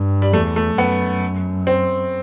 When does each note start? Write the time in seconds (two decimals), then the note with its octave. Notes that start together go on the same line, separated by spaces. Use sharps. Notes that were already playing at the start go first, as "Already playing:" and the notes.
Already playing: G2
0.22 G3
0.33 E2 A3
0.56 A3
0.78 F#2 B3
1.67 C4